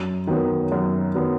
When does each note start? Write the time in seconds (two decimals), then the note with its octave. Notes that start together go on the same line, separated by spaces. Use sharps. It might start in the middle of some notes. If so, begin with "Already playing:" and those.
Already playing: F#2
0.27 D#3 F#3 B3
0.72 F#2
1.15 D#3 F#3 B3